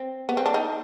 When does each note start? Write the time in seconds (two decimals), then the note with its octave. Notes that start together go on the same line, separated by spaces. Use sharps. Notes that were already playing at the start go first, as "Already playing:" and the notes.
Already playing: C4
0.29 B3
0.37 C4
0.46 D4
0.54 D#4